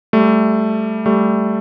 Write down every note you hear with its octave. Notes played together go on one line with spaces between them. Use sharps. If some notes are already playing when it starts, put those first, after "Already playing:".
G3 A3
G3 A3